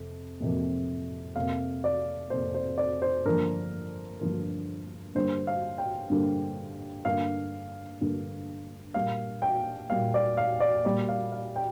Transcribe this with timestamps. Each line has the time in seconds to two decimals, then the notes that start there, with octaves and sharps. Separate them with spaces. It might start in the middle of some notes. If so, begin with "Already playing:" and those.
Already playing: F2 C3
0.40 F2 C3 F3 A#3
1.36 F2 C3 A#3 F5
1.84 D5
2.30 F2 C3 A#3 C5
2.55 C5
2.78 D5
3.02 C5
3.25 G2 D3 F3 A#3 A#4
4.20 G2 D3 F3 A#3
5.15 G2 D3 G3 A#3 C5
5.47 F5
5.78 G5
6.10 G2 D3 G3 A#3
7.05 G2 D3 A#3 F5
8.01 G2 D3 A#3
8.94 A#2 G3 A#3 F5
9.42 G5
9.90 A#2 G3 A#3 F5
10.14 D5
10.37 F5
10.60 D5
10.84 A#2 G3 A#3 D5
11.09 F5
11.32 F5
11.56 G5